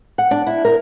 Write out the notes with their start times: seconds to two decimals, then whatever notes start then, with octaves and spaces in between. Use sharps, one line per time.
0.18 F#5
0.31 D4
0.47 E4
0.65 A#4